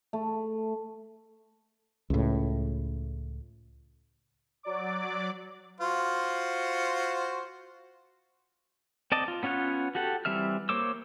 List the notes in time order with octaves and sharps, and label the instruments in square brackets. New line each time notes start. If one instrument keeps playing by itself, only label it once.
[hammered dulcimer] A3
[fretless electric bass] C#2 A2
[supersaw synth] F#3 D5 D6
[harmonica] F4 F#4 C5
[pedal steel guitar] C4 D5 D#5 A5
F4
B3 C#4 F4 C#5 F#5
F#4 G4 A4 F#5
E3 G3 C4 E5 F6
A#3 C5 C#5 D6 E6